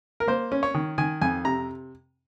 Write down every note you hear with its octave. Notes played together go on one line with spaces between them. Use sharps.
A#4
A#3 C5
C#4
C#5
D#3
D#3 G#5
F2 G#5
C3 A#5